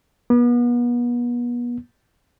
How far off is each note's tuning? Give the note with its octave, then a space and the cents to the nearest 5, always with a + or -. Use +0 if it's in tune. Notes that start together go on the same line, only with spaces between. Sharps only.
B3 -35